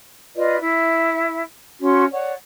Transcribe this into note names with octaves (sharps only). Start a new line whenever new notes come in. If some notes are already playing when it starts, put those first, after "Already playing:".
F4 B4 D5 D#5
E4 E5
C#4 F#4 C6
C#5 D5 F#5